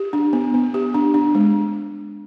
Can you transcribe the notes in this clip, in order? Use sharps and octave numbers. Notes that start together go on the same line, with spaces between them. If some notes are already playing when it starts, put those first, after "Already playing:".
Already playing: G4
D4
B3
B3
G4
D4
D4
G#3